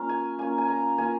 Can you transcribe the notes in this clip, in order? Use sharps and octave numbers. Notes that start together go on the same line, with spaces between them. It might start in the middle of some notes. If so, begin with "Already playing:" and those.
Already playing: A#3 C#4 F4 F5
G#5
A#3 C#4 F4 G#5
G#5
A#5
A#3 C#4 F4 G#5